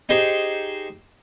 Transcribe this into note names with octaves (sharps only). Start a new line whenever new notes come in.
D#4 G4 G#4 C5